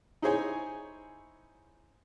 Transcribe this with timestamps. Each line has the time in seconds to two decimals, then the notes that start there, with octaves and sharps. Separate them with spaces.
0.22 D#4 E4 G#4 C5 C#5 G#5